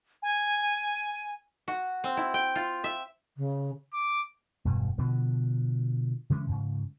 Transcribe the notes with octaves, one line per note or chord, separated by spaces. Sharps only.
G#5
F#4
C4
E4
G5
F4
E5
C#3
D6
E1 G2 B2
B2 D3 F3
C#3 E3 G#3 C#4
G#2 C#3